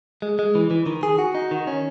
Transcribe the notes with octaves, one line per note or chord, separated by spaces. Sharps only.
G#3
G#3
E3
E3
D#3
G#4
F#4
D#4
D#3
C#4